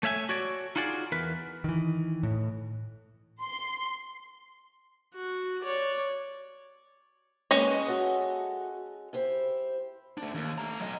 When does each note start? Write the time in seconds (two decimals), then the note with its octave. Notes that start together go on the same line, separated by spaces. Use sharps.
0.03 A3 C#5 E5 F5 G#5
0.29 F#4 C#5 D5
0.76 D#4 F4 F#4 G#4 D5
1.12 E2 A#4 B4
1.64 D#3 E3
2.23 A2
3.42 C6
5.14 F#4
5.62 C#5 D5
7.51 G#3 A#3 C#4 B4 D#5
7.88 F#4 A4 E5
9.13 E4 G4 C5
10.18 A3 D4
10.35 D#2
10.58 A3 A#5
10.80 F#3 D#5